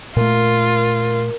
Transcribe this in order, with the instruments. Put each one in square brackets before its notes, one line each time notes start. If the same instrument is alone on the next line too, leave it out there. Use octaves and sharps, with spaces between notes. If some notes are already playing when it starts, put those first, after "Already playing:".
[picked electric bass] A#2 A3 [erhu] F4 [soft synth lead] A#4